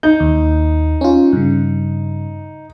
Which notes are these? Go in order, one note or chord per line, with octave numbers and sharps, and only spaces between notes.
D#4 G6
D#2
C#4 F4
G2 C#3